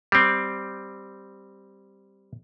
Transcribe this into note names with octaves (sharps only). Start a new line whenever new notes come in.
G3 C4